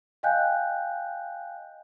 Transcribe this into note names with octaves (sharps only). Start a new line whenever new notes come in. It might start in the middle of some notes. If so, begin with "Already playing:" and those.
D#5 F5 G5 G#5 F#6 G6